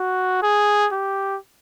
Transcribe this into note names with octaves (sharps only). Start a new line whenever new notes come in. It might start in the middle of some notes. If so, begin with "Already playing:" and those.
Already playing: F#4
G#4
G4